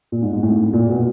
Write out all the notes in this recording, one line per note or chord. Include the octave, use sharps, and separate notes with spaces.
A#2
G#2
G#2
A2
A#2
B2